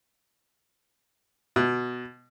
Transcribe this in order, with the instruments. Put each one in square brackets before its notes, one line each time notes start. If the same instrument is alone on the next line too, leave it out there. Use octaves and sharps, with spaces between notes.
[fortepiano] B2